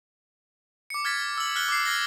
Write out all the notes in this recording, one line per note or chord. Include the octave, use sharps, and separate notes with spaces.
D6 C#7
F6 G#6 A6 B6
E6 F#7
F6 F#6 B6 G7
D6 C7
F6 G#6 A#6 G7